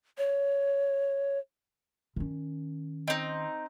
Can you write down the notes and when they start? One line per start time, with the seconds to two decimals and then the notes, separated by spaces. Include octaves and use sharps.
0.18 C#5
2.16 D#3 C#4
3.08 C4 D#4 D#5